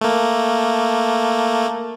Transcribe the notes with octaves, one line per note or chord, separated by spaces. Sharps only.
A3 A#3